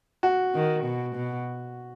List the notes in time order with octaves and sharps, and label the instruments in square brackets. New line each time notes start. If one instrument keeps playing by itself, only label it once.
[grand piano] F#4
[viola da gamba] D#3
B2
B2